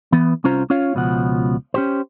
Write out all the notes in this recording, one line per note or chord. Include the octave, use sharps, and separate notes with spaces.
E3 B3
C2 C#4 F4 C5 A#5
C#4 F4 C#5 F5
C#2 B2 F3 F#5
C#4 G4 C5